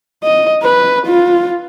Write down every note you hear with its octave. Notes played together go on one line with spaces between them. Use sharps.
D#5
B4
F4